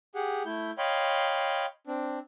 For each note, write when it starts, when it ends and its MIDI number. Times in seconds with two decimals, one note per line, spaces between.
0.15 0.43 67
0.15 0.43 68
0.15 0.43 78
0.45 0.71 57
0.45 0.71 64
0.45 0.71 91
0.78 1.66 73
0.78 1.66 75
0.78 1.66 77
0.78 1.66 79
0.78 1.66 83
0.78 1.66 84
1.87 2.19 60
1.87 2.19 62